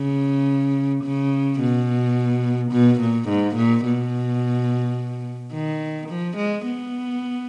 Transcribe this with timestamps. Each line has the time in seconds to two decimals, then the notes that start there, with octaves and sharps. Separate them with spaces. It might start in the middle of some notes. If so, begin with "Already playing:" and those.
Already playing: C#3
1.04 C#3
1.60 B2
2.72 B2
3.01 A#2
3.29 G#2
3.56 A#2
3.85 B2
5.53 D#3
6.09 F3
6.37 G#3
6.65 B3